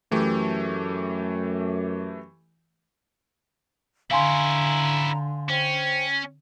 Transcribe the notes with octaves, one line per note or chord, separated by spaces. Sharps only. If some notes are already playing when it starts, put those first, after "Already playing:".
F#2 E3 A3 G4
D3 C#4 E4 F5 G#5 A#5 C6
C#4 C5 G5